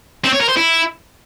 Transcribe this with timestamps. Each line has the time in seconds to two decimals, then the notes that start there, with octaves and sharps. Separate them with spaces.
0.24 C4
0.33 C#5
0.41 A#4
0.49 C5
0.57 E4